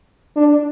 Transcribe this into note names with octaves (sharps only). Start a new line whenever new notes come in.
D4